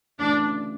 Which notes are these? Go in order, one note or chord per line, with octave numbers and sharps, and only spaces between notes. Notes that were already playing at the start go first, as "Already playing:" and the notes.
D2 C#3 E3 D4